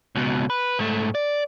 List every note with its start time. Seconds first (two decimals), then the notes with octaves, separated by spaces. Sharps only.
0.15 C#2 B2
0.50 B4
0.79 G#2 A3
1.15 D5